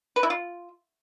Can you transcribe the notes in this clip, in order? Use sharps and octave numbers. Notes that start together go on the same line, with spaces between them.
B4
E4
F4